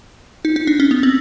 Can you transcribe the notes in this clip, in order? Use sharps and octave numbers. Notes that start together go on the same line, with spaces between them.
D#4
D#4
D4
C#4
B3
C4